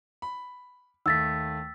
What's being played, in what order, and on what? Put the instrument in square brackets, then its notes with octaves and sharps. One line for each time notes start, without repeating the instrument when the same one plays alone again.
[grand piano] B5
[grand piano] D#2 A3 [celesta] E6 A6 B6